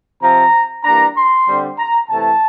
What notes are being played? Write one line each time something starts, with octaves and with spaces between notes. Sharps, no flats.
C3 F3 C4 A#5
E3 G3 A#3 D4 A#5
C6
D3 G3 C4
A#5
C3 E3 A3 A5